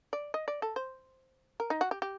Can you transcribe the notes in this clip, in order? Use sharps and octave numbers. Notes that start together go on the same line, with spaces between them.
D5
D#5
D5
A4
C5
A#4
D#4
F#4
G4
G4